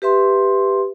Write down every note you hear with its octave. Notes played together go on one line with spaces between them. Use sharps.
G4 B4 E5 C6